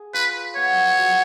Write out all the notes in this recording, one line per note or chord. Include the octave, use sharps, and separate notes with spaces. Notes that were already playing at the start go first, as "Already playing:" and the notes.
Already playing: G#4
F4 B4
B3 C#5
F#3